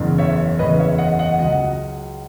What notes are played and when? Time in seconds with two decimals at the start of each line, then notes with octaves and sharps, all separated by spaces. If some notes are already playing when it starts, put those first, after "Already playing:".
Already playing: F#1 E2 C#3
0.18 C#5 E5
0.59 F#1 E2 C#3 B4 D#5
0.79 C#5 E5
0.98 D#5 F#5
1.19 D#5 F#5
1.39 C#2 C#3 F#3 D#5 F#5